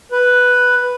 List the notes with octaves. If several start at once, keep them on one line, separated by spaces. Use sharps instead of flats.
B4